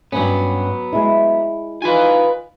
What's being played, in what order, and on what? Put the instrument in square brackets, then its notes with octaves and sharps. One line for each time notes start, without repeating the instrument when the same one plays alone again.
[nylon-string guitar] G2 C#4 [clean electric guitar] F#3 B3
[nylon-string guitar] G#3 E4
[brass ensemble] D#4 F4 [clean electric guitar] B4 G#5